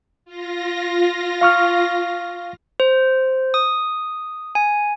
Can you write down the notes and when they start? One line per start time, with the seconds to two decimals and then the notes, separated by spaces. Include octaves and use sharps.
0.25 F4 A#6
1.41 F5 C#6 F6
2.80 C5
3.54 D#6
4.55 G#5